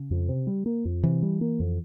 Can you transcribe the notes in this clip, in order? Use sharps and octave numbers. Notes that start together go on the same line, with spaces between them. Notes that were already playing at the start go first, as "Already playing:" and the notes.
Already playing: C#3
F2
C3
G3
A#3
F2
C3 E3
G3
A#3
F2